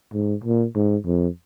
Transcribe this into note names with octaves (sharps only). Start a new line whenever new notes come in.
G#2
A#2
G#2
F2